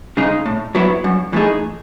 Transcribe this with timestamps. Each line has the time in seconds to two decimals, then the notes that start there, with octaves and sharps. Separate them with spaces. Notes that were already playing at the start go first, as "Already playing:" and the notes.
0.17 C#3 G#3 D#4
0.46 A2
0.75 F#3 B3 E4
1.04 F#2
1.33 E3 A3 D#4 G#4